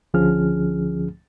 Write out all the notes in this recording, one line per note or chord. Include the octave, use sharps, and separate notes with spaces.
C#2 D3 F3 C#4 G#4 F6